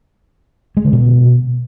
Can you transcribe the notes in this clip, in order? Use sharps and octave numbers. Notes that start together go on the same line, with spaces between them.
G#3
D3
B2